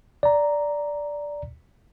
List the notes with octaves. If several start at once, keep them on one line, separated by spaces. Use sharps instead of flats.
D5 A#5